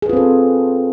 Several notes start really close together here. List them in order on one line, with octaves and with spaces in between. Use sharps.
G#4 B4 F4 C4 A4